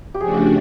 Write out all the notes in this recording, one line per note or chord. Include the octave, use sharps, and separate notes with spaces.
G4
C#3 F3 A3 D4 F#4 G#4
G4